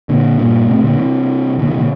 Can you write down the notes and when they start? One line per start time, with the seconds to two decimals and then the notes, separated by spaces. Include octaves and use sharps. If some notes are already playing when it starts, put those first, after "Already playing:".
0.09 A#2 D3
0.39 G2 A#2
0.69 A2 C3
0.84 A#2 D3
0.98 C3 E3
1.59 A#2 D3
1.68 C3 E3
1.78 A#2 D3